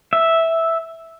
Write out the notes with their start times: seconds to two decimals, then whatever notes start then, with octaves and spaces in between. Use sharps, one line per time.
0.13 E5